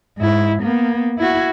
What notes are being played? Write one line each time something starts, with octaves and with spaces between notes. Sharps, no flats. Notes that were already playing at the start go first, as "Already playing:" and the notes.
G#2 E4
A#3 B3
E4 F#4